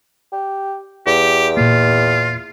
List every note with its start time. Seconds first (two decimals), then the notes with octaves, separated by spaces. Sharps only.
0.32 G4
1.07 E2 G4
1.57 A#2 A#3 F4